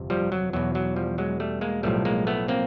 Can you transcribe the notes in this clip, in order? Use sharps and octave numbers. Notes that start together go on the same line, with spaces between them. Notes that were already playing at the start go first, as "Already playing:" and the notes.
Already playing: G1 F2 C3
F3 G3
F#3
E2 B2 F#3
F#3
F3 G3
F#3 G#3
G3 A3
G#3 A#3
B1 A2 F3 G3 A3
G#3 A#3
A3 B3
A#3 C4